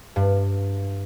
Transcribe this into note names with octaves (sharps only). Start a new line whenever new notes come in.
G2